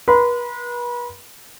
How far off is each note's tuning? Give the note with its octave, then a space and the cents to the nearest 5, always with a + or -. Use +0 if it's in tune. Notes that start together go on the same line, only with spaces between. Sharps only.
B4 -40 C6 -45